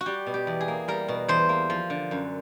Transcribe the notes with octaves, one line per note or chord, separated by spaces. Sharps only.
F#4
G3 G4
B2
G4
E2
G#4
A#3
G3 A#4
B2
E2 C5
A#3
F3
D3
F#2